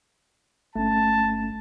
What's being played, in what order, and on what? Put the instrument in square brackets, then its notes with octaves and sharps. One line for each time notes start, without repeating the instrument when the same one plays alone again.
[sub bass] G1 [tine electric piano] A3 C#4 [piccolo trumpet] A5